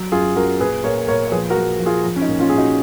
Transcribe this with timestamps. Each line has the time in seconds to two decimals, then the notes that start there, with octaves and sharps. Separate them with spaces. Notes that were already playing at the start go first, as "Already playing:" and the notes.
Already playing: F#3
0.12 F#2 F4 G#4
0.35 F#2 F#4 A#4
0.60 A#2 G#4 B4
0.84 A#2 A#4 C#5
1.07 A#2 A#4 C#5
1.27 C#5
1.31 F3 G#4 B4
1.50 F#4 A#4
1.56 F3
1.79 F3
1.86 F4 G#4
2.04 F3
2.16 C#4
2.21 D#4
2.28 A#2
2.40 C#4 F4
2.49 A#2 G#4
2.57 D#4 F#4